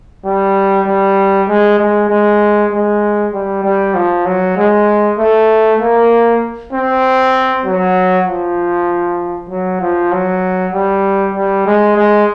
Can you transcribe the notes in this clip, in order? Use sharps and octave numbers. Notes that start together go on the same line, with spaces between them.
G3
G3
G#3
G#3
G#3
G#3
G3
G3
F3
F#3
G#3
A3
A#3
C4
F#3
F3
F#3
F3
F#3
G3
G3
G#3
G#3